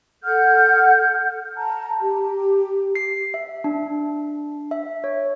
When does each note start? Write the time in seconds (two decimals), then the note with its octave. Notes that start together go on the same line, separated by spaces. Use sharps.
0.23 A4 F#5 F6 G6
1.57 A5 A#5
2.02 G4
2.95 C7
3.34 E5
3.64 D4
4.71 E5
5.04 C#5